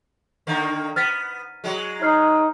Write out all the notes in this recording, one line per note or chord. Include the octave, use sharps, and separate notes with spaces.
D3 D#3 A#3
B3 F6 A6 B6
F#3 G#3
D#4 C#5 F6 C7